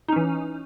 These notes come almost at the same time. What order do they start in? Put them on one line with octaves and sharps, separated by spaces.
D#4 C#4 E3